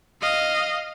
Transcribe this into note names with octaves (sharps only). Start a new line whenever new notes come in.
D#5 F5